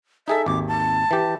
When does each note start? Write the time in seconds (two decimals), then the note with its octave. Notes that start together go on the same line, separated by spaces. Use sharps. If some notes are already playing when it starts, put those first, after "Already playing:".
0.28 D#4 G#4 A4 E5
0.46 G#1 D#2 D6
0.68 A5
1.11 E3 G4